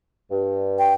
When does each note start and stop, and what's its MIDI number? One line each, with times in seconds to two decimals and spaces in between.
0.31 0.94 43
0.79 0.94 79